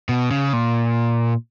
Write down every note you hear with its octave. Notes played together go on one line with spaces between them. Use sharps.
B2
C#3
A#2